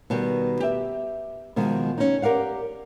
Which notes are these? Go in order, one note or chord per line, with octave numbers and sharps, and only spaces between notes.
B2 D#3 G3
G4 E5
B2 D#3 F3 G#3
C#4 D#4
G4 A#4 D5 F5 F#5